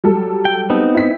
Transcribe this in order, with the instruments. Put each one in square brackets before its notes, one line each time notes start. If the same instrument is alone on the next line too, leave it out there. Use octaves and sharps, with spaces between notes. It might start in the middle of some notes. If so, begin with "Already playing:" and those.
[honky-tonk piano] F#3 G3 A4
[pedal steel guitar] G5
B3 C4 D#4
[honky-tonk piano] E4 B6